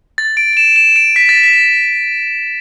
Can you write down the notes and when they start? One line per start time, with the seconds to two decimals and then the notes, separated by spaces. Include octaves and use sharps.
0.18 A6
0.37 D7
0.53 D7
0.57 E7
0.76 E7
0.96 D7
1.16 B6
1.29 A6
1.43 B6